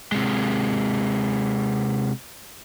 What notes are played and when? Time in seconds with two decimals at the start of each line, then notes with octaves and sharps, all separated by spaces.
0.12 C3 G#3